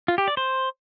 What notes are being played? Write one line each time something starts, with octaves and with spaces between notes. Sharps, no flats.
F4
G4
D5
C5